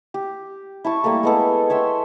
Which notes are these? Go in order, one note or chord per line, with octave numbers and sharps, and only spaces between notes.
G4
E4 A5 C#6
G3 A3 A#3 A4
G#3 B3 A4
C#5 E5 G5 C6